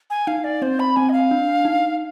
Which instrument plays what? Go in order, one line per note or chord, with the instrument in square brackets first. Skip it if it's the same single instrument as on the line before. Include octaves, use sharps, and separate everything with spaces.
[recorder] G#5
[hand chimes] D#4 [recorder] F5
[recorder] D5
[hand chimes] C4 [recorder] C5
[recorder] B5
[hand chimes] C4 [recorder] G#5
[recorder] D#5
F5
[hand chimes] D4
D#4